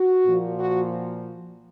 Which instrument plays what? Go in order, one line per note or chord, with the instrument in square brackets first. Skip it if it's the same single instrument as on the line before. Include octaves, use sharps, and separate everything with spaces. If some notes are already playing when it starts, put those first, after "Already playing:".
Already playing: [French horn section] F#4
A#2 F3
F#4